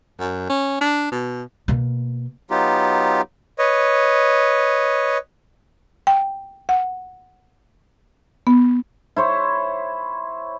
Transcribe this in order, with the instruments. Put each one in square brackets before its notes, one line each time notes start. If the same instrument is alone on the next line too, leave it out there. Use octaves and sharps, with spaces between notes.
[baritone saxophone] F#2
C#4
D4
B2
[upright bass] B2 A#3
[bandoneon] F#3 B3 D#4 F4 G4
[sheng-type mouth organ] B4 C#5 D#5
[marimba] G5
F#5
B3
[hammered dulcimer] E4 C5 C#5